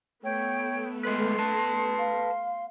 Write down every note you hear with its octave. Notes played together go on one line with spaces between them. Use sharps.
A3 B3 C#5 G5
G#3 B4 C6
B4 A5
F5